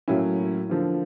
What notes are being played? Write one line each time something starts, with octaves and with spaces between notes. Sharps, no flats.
A2 F#3 A#3 C#4 E4
D3 F3 A#3